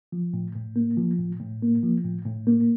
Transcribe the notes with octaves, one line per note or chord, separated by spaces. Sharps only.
F3
A2
A2
A#3
F3
A2
A2
A#3
F3
A2
A2
A#3